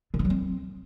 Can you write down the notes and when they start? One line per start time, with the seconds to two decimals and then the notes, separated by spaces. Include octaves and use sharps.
0.14 D3
0.19 E3
0.25 F#3
0.30 C4